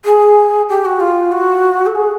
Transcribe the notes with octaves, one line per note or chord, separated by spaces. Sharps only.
G#4
G4
F#4
F4
F#4
A4
G#4